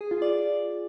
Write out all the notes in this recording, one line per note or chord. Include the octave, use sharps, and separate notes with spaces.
G#4
F4
D5